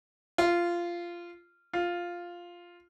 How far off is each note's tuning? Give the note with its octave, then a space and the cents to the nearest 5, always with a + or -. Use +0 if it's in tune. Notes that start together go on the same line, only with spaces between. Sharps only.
F4 -15
F4 +0